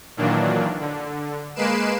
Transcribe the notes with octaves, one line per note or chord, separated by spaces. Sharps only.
A#2 D#3 E3 F#3 A#3 D4
D3
G#3 A#3 B4 C7 D7 E7